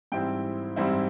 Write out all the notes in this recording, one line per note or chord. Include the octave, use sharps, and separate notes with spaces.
G#2 E3 G3 C4 E4 G5
G#2 E3 G3 C4 E4